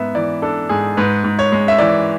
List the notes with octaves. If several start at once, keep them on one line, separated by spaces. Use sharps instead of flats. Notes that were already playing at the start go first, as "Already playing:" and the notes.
Already playing: G#2 B3 E5
E3 D5
D4 A4
G#2 G#4
G#2 B4
G#2
C#5
G#3
E5
E3 D5